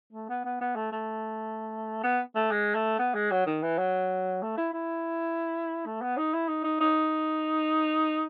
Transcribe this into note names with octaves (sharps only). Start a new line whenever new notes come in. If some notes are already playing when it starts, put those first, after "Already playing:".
A3
B3
B3
B3
A3
A3
B3
A3
G#3
A3
B3
G#3
F#3
D#3
E3
F#3
A3
E4
E4
A3
B3
D#4
E4
D#4
D#4
D#4